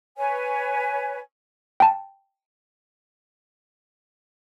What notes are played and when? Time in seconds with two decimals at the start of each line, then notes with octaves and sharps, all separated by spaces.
0.17 B4 C#5 G#5
1.80 G5 A5